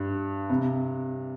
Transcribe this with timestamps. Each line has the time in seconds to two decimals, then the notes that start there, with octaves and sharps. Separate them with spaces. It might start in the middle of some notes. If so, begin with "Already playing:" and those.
Already playing: G2
0.50 C3